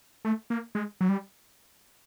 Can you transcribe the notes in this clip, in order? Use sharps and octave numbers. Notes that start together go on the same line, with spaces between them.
A3
A#3
G#3
F#3
G3